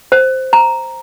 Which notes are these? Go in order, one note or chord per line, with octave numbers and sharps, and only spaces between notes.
C5
A#5